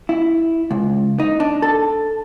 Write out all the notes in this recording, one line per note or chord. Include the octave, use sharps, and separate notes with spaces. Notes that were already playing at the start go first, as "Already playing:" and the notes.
E4
C#2
D#4
D4
A4